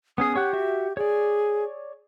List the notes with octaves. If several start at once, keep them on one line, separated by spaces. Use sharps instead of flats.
B3 C#4 G#4 D#6
G4 C#5 F#5 F#6
F#4 E5
G#4 C#5 D5